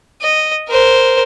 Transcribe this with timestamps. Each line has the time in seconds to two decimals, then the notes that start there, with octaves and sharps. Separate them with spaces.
0.22 D#5
0.69 A#4 C5